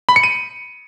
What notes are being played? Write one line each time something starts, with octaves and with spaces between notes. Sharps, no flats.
B5
C#7
D#7